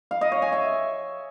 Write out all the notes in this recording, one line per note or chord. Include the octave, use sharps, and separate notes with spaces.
F5
D#5
C#5
G#5
E5